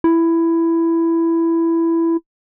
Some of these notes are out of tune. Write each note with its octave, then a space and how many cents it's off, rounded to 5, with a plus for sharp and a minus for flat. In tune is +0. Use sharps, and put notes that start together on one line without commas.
E4 +10